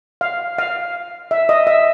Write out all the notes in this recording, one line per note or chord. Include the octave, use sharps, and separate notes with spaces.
F5
F5
E5
D#5
E5